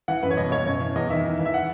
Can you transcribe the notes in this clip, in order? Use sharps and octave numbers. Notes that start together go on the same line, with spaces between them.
E3 F#5
F#2 B4
C#5
B2 D#5
B2 C#5
F#2 C#5
E3
E2 D#5
D#3 E5
E3
E3
E5
F#5